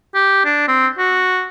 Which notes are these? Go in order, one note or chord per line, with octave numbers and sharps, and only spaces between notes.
G4
D4
C4
F#4